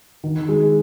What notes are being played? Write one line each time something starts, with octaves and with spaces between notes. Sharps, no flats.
D#3
G#3